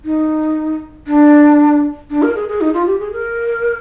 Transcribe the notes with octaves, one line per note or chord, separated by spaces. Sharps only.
D#4
D4
D4
A#4
G#4
G#4
D#4
F4
G4
G#4
A#4